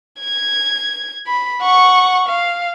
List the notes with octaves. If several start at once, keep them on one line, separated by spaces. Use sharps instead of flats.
G#6
B5
F#5 C#6
F5